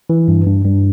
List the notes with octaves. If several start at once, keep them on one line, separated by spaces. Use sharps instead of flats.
E3
G2
G2
G2